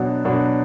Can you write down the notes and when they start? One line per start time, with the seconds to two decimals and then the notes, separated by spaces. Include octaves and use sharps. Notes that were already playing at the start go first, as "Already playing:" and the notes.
Already playing: B2 F#3 B3 D4
0.25 B2 F#3 B3 D4